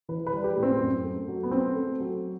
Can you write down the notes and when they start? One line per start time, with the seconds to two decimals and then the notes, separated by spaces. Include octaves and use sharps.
0.09 E3 B4
0.27 B4
0.33 G3
0.44 G4
0.56 A2
0.63 C4
0.80 F#2
1.04 A3
1.28 F#3
1.43 B3
1.51 A3 C4
1.76 A3
2.00 F#3